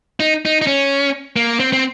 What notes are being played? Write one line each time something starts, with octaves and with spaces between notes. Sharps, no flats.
D#4
D#4
D#4
C#4
A#3
C4
C4